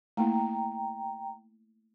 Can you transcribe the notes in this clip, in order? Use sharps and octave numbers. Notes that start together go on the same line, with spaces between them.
A3 A#3 E4 G5 A#5